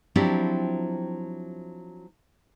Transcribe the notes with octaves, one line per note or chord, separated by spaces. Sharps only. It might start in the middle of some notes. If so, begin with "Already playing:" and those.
F3 F#3 C4 D4 E4 G4